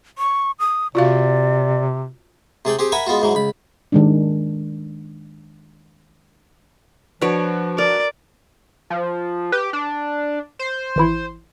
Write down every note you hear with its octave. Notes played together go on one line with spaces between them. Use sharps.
C#6
D#6
C3 F4 F#4 D5 F5
C3 G#4 D5 G5
C4 G4 G#4
A#4 E5 F#5 G#5 B5
G#3 B3 F4 F#4
G#2 E3 F#3
C#2 B5
D#3 G#3 D4
F3 D4 F#4 B4 C#5 D7
A#4 D5
F3
G4 B4
D4
C5
G#1 E3 E4